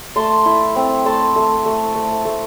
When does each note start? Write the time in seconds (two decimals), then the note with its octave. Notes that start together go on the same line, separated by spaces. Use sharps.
0.16 A3 A5 C6
0.46 E4
0.76 C4
1.05 A3 A5 C6
1.36 A3
1.66 A3
1.95 A3
2.25 A3